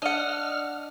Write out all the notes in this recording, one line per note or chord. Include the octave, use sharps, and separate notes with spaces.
D4 D#5 F#5 F6